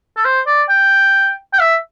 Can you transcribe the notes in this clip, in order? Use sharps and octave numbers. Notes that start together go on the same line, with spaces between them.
A4
C5
D5
G5
G5
E5